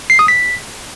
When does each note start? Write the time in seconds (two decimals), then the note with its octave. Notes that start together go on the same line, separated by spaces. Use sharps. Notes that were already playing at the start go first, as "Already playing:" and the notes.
0.10 C7
0.19 D#6
0.28 B6